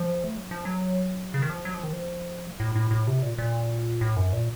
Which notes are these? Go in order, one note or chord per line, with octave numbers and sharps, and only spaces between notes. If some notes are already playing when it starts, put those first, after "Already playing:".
Already playing: F3
A3
F#3
F3
F#3
C#3
D#3
F3
F#3
F3
D#3
F3
A2
A2
A2
C3
A#2
A#2
A2
F#2
A#2